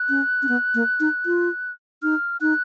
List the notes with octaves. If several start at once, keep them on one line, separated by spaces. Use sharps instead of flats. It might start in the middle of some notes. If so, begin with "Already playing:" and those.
Already playing: F#6
C#4
C#4
B3
A#3
D#4
F4
D#4 F6
D#4 F#6